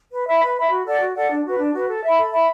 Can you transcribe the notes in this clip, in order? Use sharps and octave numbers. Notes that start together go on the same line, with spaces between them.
B4
E5 B5
B4
E5 B5
F#4
A4 D5 F#5
F#4
A4 D5 F#5
D4
F#4 B4
D4
F#4 B4
A4
E5 B5
A4
E5 B5